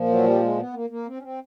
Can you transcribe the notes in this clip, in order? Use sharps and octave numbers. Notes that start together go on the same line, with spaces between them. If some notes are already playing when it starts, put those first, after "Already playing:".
Already playing: A#2 F3
F#3
G3
G#3
B3
A#3
A#3
C4
C#4
C4